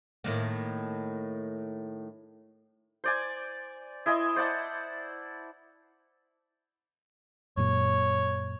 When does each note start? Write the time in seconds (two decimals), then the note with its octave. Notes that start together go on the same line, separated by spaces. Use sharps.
0.24 A2 D#3 A#3
3.04 C5 D5 G#5
4.06 E4 D#5 G#5 C6
4.36 C5 D5 F#5 A5
7.57 F#2 A#2 C#5